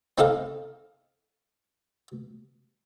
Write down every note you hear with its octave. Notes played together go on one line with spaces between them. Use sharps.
C4 D#4 A4 D#5 F5